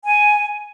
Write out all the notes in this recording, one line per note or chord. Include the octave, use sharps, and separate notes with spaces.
G#5